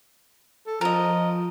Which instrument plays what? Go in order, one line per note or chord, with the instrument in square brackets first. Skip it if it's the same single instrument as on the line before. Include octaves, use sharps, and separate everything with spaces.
[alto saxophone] A4
[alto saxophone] F3 [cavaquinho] A#4 D#5